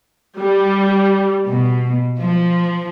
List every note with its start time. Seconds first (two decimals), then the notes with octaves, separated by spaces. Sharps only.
0.37 G3
1.46 B2
2.18 F3